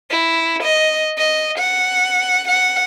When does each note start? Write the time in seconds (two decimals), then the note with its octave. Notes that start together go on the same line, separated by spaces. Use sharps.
0.10 E4
0.63 D#5
1.17 D#5
1.58 F#5
2.48 F#5